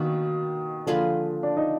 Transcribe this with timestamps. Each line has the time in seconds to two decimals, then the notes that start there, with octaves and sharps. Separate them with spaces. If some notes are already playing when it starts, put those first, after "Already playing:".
Already playing: B2 D#3 A#3 D4 F#4
0.87 D3 F3 A#3 F4 G#4 B4
1.43 D4
1.57 D#4